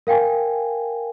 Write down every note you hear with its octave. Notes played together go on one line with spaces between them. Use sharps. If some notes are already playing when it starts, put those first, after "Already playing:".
A#4 F5 G5 G#5